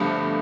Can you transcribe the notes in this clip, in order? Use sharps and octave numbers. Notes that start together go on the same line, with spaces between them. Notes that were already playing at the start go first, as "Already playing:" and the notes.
Already playing: G1 G2 D3 F3 A3